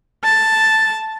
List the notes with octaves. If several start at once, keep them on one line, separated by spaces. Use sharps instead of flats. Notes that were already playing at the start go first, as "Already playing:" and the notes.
A5